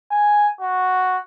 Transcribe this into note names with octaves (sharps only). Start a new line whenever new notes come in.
G#5
F#4